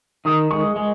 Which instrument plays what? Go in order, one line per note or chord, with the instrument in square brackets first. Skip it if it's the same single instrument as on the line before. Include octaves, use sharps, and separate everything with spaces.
[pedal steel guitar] D#3 [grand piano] D#6
[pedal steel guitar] G#3 [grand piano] C#6
[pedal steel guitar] G#3